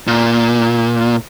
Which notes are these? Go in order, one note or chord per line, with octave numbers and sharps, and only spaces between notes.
A#2